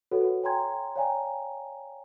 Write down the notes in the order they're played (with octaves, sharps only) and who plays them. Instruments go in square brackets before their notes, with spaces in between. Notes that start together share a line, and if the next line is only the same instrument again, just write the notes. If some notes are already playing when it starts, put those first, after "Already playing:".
[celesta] F#4 A4 B4 C#5 F#5
C#5 G5 G#5 A#5 C6 G#6
C#5 D5 F5 G5 G#5 A#5